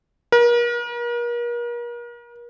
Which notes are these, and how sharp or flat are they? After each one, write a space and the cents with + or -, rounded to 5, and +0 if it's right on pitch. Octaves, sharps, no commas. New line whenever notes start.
A#4 +40